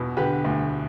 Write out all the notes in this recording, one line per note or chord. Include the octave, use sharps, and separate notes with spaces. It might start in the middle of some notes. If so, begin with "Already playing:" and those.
Already playing: E2 B2
D3 G4 B4
D2